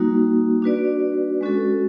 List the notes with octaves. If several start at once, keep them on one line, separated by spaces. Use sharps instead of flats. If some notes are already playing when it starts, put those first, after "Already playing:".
Already playing: G3 A#3 D#4 F#4
D4 F#4 B4 D5
G#3 C#4 F#4 A4